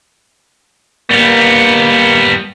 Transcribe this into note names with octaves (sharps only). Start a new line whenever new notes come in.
G3 A#3 B3